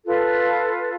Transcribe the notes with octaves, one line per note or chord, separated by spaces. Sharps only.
F4 A4 B4